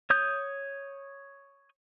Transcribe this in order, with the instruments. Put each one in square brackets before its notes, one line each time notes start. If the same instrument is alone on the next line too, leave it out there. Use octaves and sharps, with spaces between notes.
[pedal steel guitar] C#5 D#6 G6